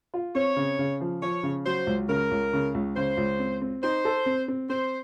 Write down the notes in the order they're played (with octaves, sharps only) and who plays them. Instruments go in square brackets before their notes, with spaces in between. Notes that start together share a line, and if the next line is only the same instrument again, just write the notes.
[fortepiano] F4
[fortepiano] C4 [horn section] C#5
[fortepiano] C#3
C#3
F3
[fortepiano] F3 [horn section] C#5
[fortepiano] C#3
[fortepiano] F#3 [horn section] C5
[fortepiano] C#2
[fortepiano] C#3 [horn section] A#4
[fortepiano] C#2
C#3
C#2
[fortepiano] C#3 [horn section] C5
[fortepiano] C#2
C4
C4
[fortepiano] D#4 [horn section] C5
[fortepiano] A4
C4
C4
[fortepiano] C4 [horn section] C5